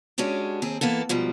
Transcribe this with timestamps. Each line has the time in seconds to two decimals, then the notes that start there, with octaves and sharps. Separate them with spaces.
0.18 G#3 C#4 D4 F#4 G4
0.62 D#2 C4 G#4
0.81 E3 A#3 B3 A4
1.09 G#2 B2 F3 G3